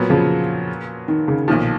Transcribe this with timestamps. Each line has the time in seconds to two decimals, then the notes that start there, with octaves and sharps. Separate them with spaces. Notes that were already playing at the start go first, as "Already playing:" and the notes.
Already playing: A#2 F#3 B3
0.10 C#3 F3
1.08 D#3
1.28 C#3
1.48 B1 A#2 D#3 F3